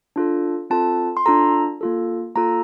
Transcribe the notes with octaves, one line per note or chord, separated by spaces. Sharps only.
D4 F4 A4
C4 F4 A4 A5
C6
D4 F4 A4 A#5
A#3 F4 A4
A#3 F4 A4 A#5